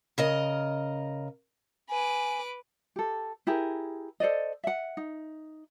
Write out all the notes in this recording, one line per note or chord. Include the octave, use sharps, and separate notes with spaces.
C#3 A#4 D#5
B4 G#5 D6
G4 A4
E4 G4 G#4 A#4
A4 C5 D5 D#5
E5 F#5
D#4